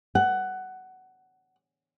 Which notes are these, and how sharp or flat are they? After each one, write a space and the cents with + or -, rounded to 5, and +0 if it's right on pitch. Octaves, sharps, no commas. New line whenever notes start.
F#5 +15